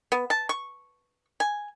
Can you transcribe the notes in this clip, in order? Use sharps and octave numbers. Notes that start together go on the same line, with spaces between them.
B3
A5
C#6
G#5